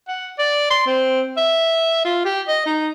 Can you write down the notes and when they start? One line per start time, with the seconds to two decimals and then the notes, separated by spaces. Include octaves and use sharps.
0.08 F#5
0.39 D5
0.70 C6
0.86 C4
1.37 E5
2.05 F4
2.25 G4
2.48 D#5
2.66 D#4